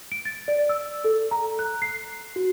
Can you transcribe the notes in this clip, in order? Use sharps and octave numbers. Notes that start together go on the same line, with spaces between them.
D7
A6
D5
E6
A4
A#5
F#6
C7
F#4